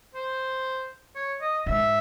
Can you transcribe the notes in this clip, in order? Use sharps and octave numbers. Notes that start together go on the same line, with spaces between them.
C5
C#5
D#5
G#2 E5